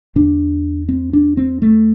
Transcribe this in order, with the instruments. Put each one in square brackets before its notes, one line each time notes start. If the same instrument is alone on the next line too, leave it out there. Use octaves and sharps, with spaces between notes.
[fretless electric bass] E2 D3 D4
C4
D4
C4
A3